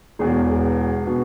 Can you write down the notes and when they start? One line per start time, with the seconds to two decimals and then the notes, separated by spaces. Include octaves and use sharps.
0.19 E1 E2 B2 G#4
1.07 B2